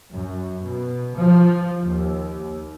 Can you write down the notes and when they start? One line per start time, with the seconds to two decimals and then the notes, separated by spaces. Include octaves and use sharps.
0.13 F#2
0.64 B2
1.18 F3
1.84 D#2